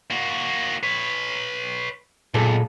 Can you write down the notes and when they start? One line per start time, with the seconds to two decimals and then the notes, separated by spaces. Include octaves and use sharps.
0.10 A#3 F#4
0.83 B4 C#5
2.34 B1 A#2 G#4 A4